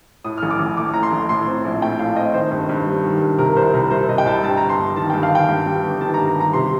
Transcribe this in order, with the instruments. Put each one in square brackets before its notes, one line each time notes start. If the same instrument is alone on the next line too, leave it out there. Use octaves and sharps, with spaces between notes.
[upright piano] A2 D#6
F6
A1
D6
A1
A3 D6
A2 A#5
C6
A1
A2 C6
C4
A#1
A3 G5
A2 F5
C4 D#5
D#3 C5
G2
G2
G3
D#3
G2
C3 A#4
C2 C5
C2 A#4
G3 C5
C3 D#5
G5
C2 A5
G2 A5
A#5
G1
C6
G1
D#3 A5
G2 G5
F5
G1 G5
G2
G3
G1
D#3 A5
G2 A#5
A#5
G3
A#5
C3 C6